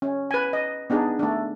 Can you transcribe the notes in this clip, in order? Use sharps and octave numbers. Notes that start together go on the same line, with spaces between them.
C#4
B4 G#5
D#5
B3 D4 D#4 G#4
A3 D4